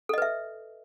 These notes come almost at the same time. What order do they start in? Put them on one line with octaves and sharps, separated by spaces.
A4 D#5 B4 E5